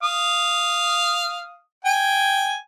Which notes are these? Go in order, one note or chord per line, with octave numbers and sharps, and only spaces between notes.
F5 D#6
G5 G#5